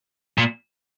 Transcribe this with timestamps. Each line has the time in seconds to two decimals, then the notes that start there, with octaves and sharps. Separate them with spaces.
0.38 A#2